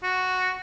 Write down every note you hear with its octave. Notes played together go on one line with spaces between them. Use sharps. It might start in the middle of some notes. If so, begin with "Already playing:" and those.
F#4